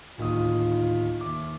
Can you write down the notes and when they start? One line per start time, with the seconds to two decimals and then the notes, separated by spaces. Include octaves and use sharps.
0.18 D1 D#2 D#4 F4 D#6
1.21 D#2 E5 D6